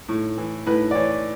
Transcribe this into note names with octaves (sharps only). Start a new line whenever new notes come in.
A2
E3
A2 B4
D5
E3 C#5